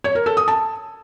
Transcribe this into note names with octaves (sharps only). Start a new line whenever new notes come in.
C#5
A#4
A4
D#6
A5